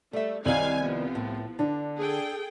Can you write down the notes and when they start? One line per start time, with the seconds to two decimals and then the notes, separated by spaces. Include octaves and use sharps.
0.13 G3 A3 E5
0.45 C2 D#3 F#3 G3 F5 G#5 F#7
0.81 F3 B3
1.15 A2
1.59 D3 D4
1.98 G#4 A4 G5